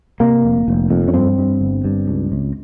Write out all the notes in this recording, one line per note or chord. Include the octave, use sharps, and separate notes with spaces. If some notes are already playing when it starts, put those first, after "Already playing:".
C3 A#3
F1
F1
F2
C#4
G2 C4
G2
G1
G2
C#2
C#2